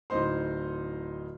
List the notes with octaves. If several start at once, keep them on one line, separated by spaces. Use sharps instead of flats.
D1 A2 D#4 C5 C6